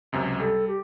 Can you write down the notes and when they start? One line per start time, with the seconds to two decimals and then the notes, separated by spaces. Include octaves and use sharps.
0.12 C#2 F#2 C3
0.40 G3 A4
0.67 G4